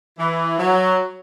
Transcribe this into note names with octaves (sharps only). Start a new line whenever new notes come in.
E3
F#3